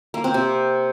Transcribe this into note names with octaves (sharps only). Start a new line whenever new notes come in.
A#3
C4
C3